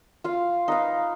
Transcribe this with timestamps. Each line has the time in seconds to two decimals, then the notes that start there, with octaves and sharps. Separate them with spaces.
0.24 F4 F5
0.68 D#4 B4 F5